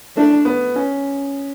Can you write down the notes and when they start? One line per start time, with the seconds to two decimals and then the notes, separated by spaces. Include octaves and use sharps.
0.17 A3 D4
0.45 B3
0.76 C#4